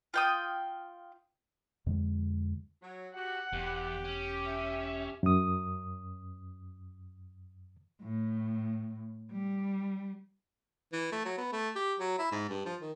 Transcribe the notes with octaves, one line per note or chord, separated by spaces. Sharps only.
F4 G5 D#6
F2 D3 G#3
F#3
F#4 G4 F#5
E1 E2 G4
C#4
E5
F#2 D#6
A2
G3
E3
A3
F#3
B3
A3
G4
F#3
E4
G#2
G2
F3
D#3